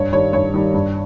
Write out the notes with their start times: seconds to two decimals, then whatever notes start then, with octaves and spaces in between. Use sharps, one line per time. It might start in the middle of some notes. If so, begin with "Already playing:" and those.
Already playing: G2 C#5
0.13 D#3 G3 C#5
0.33 G2 C#5
0.54 D#3 G3
0.74 G2